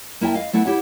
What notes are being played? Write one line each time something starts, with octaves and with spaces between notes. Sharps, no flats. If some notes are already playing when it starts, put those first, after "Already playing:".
A#3 E4 E5 G5 A5
D#5 F5
A3 B3 E4 F#5
E4 G4 C#5 F#5